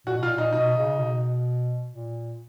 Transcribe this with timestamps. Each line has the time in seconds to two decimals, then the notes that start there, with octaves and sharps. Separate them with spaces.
0.07 A#2 F#4
0.17 B2
0.23 F4
0.28 A#2
0.38 D#4
0.52 B2 D#4
0.77 C#3
0.99 B2
1.91 A#2